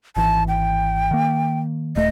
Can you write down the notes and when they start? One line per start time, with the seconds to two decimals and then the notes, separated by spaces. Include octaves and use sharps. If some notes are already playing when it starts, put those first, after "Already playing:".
0.17 G#1 E3 A5
0.48 G5
1.11 D#3 A#3
1.96 D#1 A3 D#5